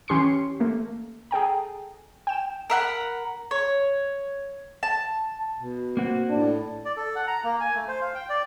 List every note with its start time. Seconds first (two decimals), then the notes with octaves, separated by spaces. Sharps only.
0.08 E3 C#4 G4 C6 C7 C#7
0.60 A3 A#3
1.31 G#4 A4 G5 A#5
2.27 G5 E7
2.70 A#4 E5 F#5 B5
3.51 C#5
4.83 A5
5.57 B2
5.97 A#3 C4 F#4
6.29 A2 D4
6.85 D5
6.97 A4
7.16 F#5
7.28 A#5
7.44 A#3
7.61 G#5
7.75 A3
7.88 C5
8.01 F5
8.15 G5
8.30 D5